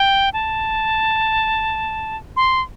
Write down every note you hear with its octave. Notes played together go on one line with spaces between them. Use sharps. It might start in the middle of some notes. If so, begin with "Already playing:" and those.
Already playing: G5
A5
C6